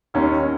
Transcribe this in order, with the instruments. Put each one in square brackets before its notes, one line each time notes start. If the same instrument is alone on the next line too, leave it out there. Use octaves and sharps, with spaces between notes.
[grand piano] D#2 D#3 A#3 C#4